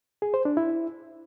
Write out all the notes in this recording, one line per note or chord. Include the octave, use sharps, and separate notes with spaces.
G#4
C5
D4
E4